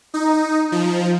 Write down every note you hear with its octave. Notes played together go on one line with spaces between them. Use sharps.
D#4
F3